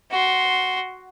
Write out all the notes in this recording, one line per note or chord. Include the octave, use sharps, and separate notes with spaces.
F#4 C6